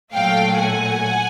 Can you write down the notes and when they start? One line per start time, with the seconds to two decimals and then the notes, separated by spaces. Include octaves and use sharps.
0.13 A#2 F#3 A3 F5 G5
0.56 F#5 G#5